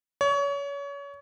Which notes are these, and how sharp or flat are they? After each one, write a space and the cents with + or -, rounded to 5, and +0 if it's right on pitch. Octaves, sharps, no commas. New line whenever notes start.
C#5 +30